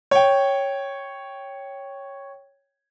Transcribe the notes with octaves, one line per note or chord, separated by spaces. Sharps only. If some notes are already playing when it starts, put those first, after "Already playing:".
C#5 G5